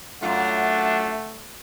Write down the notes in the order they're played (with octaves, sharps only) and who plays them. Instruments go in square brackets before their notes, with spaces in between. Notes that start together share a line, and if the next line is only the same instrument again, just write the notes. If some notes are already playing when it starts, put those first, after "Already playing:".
[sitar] F#2 F4 [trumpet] A3 [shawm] D4 [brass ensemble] F#5